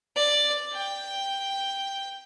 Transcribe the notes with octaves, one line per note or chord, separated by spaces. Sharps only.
D5
G5